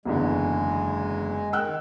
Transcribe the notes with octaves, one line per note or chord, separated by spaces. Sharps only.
F#1 E2 D3 G#3
D#3 G5 E6 F#6